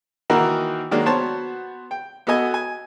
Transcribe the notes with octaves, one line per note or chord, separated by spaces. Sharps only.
D#3 E3 A#3 D#4 F#4 A#4
D#3 F#3 G#3 A#3 D4
B3 F#4 C5 C#5 A5
G5
B3 F#4 A4 D#5 G#5
G#5